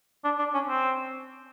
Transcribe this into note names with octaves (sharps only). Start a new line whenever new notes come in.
D4
D4
C#4
C4